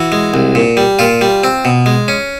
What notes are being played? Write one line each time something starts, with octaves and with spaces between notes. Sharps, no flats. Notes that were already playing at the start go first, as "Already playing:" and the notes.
Already playing: E3 F#4
G#3
C2
A#2
G3
A#2 F4
G3
C4
B2
G#3
C#4